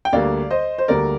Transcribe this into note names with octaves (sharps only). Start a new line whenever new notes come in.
G5
D2 D3 G3 A#3 D5 F5
C5 D#5
C5
D2 D3 G3 A#3 A#4 D5